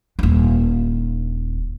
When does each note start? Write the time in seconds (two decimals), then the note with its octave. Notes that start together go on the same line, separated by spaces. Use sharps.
0.19 D#1 D4